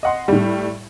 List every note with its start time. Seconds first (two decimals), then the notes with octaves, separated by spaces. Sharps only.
0.03 D#5 F#5 C6
0.28 A2 G3